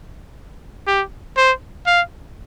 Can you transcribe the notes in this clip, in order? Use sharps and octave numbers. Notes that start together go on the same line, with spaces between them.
G4
C5
F5